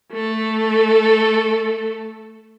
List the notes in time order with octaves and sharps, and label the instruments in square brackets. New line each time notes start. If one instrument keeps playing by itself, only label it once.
[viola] A3 A4